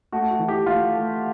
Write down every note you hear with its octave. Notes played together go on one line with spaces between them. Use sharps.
A3 F#4
F#4
E3
G4
A3 F4
A3